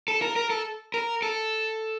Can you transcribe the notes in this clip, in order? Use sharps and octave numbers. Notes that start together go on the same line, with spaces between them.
A4
A#4
A#4
A4
A#4
A4